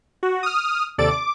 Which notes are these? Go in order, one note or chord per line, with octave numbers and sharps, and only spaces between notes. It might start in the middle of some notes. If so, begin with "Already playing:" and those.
F#4
D#6 F6
D#2 C3 A4 D5 A6 D7
D6